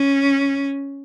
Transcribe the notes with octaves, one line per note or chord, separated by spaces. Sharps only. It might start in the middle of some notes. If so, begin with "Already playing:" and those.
Already playing: C#4